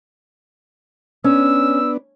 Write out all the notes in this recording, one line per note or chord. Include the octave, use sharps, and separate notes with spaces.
B3 C#4 D4 E6